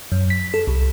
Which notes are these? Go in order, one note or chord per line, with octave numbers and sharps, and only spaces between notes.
F#2
B6
A4
C2